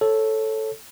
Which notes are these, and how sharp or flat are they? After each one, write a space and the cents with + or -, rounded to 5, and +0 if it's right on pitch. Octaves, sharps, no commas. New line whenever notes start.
A4 +0 C#5 -15